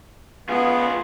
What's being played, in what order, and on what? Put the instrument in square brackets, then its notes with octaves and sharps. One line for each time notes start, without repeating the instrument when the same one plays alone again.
[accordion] B3 [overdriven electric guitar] F4 G#4